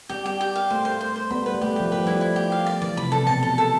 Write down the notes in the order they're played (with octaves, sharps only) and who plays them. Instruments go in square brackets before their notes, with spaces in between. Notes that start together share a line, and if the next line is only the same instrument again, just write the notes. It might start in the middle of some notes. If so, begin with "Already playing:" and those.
[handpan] G3 [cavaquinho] G4
[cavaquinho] G4
G4
F5
[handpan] A3 [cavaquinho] C5
[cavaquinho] C5
C5
C5
[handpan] G3 B3 [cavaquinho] B5
[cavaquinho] B4
[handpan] G3
[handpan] A3 [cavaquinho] G4
[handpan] F3 [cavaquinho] G4
[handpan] G3 [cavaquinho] B4
[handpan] F3 [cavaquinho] E4
[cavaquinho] E4
G4
F5
D5
[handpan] E3 [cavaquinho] D5
[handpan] C3 [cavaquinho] B5
[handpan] C3 [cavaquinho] A4
[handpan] B2 [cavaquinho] A5
[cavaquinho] A4
A4